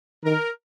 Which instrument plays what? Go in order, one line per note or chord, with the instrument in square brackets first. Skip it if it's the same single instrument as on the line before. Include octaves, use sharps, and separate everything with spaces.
[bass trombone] D#3 [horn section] A#4